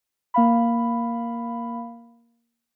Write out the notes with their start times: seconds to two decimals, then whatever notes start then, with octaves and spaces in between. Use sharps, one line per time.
0.34 A#3 F5 B5